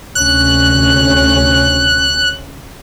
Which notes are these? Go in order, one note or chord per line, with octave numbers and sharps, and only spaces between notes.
D2 C3 C#4 F#6